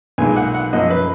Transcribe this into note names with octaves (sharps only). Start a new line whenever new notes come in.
B1 A#2 G#3 G#5
F#5
F#5
F#2 F3 A#3 D#5
B4